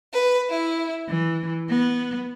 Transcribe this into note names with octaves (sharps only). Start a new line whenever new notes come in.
B4
E4
E3
B3